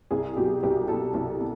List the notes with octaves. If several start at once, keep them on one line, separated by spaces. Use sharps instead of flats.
C2 G#4
B2 F#3 G4
C2 G4
B2 F#3 A4
C2
B2